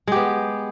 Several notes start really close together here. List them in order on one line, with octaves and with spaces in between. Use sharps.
G#3 G4 B3